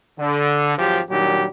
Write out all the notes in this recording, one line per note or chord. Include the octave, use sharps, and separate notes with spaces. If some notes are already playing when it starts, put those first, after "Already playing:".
D3
G#1 F3 F#3 G4
A#2 D#3 F#3 G3 D4 G4